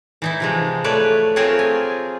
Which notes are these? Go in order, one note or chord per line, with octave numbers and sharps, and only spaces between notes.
E3 D#4 E4
C3 F3 G#3
A3 B4 C#5 D5
A3 C4 F4 G#4 A#4 C#5
G#5